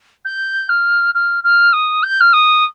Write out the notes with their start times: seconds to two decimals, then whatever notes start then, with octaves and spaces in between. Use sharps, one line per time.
0.25 G6
0.69 F6
1.14 F6
1.44 F6
1.73 D#6
2.03 G6
2.20 F6
2.33 D#6